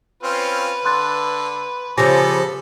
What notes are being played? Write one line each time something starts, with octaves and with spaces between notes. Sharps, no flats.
C4 C#4 F4 B4
D3 C6 F#6 A6
C#3 F3 B3 G4 A4 G#5 D6 A#6